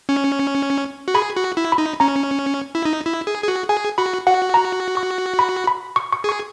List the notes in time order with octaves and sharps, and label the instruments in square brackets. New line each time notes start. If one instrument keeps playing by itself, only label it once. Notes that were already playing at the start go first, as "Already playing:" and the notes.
[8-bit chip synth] C#4
F#4
[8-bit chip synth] G#4 [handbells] B5
[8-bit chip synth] F#4
E4
[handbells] B5
[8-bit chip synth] D#4
[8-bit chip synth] C#4 [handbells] A#5
[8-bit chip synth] E4
D#4
E4
G#4
G#4
F#4
[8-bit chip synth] G#4 [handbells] G#5
[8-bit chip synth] F#4 [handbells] B5
[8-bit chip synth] F#4 [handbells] F#5
[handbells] A#5
C#6
B5
B5
C#6
C#6
[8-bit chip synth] G#4 [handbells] C#6